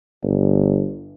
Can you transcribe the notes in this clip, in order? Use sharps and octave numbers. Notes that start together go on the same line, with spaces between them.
G1